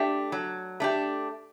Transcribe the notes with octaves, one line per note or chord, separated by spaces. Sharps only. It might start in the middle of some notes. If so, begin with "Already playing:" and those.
Already playing: A3 D4 G4
F#3
A3 D4 G4